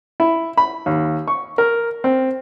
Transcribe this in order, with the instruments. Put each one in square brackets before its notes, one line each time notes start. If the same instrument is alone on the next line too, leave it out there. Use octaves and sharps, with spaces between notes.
[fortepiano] E4
B5
D#2
C#6
A#4
C4